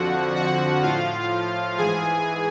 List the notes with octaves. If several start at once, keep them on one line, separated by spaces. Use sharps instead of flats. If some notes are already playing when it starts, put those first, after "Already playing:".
Already playing: F2 D3 F3 F#4 F#5
F#4 F#5
A2 F3 F4 F5
G#2 E3 G#4 G#5